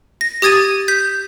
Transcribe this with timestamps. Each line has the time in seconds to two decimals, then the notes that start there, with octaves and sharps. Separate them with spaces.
0.21 A#6
0.42 G4 D#6 G#6 A6 D#7
0.88 G6 B6